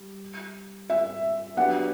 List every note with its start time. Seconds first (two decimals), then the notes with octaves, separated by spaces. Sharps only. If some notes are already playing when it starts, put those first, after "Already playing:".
Already playing: G3
0.90 E5
1.57 F#3 B3 D4 G4 B4 F#5